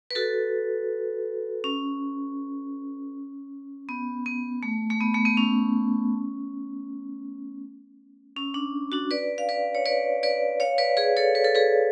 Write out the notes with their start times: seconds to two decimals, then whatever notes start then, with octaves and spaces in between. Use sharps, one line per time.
0.11 B4
0.15 F#4 A4
1.64 C#4
3.89 B3
4.26 B3
4.63 A3
4.90 A3
5.01 B3
5.14 A3
5.25 B3
5.37 C#4
8.37 C#4
8.54 D4
8.92 D4 F#4
9.11 B4 D5
9.38 F5
9.49 B4 D5
9.75 C#5
9.86 B4 D5
10.23 B4 D5
10.60 C#5 F5
10.78 B4 D5
10.97 G#4 B4
11.17 A4 C#5
11.35 B4
11.44 A4
11.55 G#4 B4